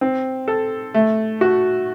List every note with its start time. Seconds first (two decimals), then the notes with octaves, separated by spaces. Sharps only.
0.01 C4
0.48 A4
0.94 A3
1.41 F#4